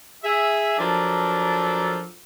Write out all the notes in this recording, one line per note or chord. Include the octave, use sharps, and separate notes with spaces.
G#4 E5
F3 F#3 D4 A4 A#4